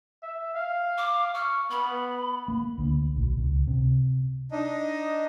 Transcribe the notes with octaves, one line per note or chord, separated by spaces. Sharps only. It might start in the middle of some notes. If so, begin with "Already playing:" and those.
E5
F5
D6
C#6 F6
B3 B5
A#3
D2
B1
C#2
C3
D4 D#4 D#5